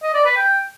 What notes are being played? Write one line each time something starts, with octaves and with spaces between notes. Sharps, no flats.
D#5
D5
B4
G5